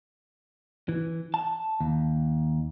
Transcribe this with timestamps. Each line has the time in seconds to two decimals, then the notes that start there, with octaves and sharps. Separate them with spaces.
0.89 E3
1.34 A5
1.81 D#2